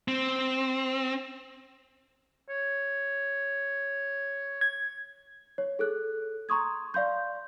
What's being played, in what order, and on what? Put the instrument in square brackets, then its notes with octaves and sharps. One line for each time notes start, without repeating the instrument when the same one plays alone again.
[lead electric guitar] C4
[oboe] C#5
[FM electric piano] G#6
[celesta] C#5
G#4 A4 F#6
A#5 C6 C#6 D#6 G#6
D5 F5 C6 G6